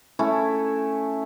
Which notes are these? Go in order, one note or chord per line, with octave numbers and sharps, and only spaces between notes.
A3 C#4 E4